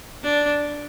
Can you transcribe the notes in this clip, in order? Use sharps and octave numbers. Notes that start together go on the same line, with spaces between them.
D4